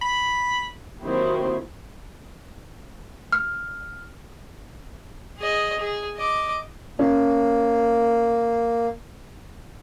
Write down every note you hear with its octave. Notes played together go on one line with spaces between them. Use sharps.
B5
D#3 F#3 A#3 C4 E4 G4
F6
G#4 D#5
G#4
D#5 D6
A#3 C#4